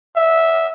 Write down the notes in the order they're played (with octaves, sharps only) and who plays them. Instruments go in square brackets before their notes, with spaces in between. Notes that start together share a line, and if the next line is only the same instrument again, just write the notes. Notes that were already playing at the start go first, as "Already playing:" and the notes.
[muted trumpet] E5